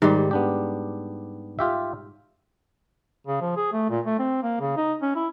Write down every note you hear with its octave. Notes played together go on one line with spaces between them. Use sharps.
G#2 D#3 G3
B3 D4 G4
F4 G4 E5
C#3
F3
G#4
A3
A#2
A3
C4
A#3
C#3
D#4
C#4
E4